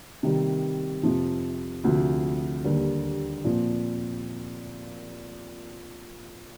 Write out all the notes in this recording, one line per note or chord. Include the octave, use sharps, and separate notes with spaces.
C3 D#3 G3
F2 C3 F3
D2 C3 F3
D#2 D3 G3
A#2 F3 C4